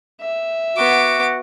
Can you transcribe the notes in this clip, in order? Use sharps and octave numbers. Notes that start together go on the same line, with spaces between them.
E5
B3 F#4 D6